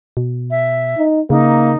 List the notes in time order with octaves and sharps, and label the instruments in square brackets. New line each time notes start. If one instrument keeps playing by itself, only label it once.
[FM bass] B2
[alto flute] E5
[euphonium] D#4
[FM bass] C#3 [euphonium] A#3 [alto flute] D#4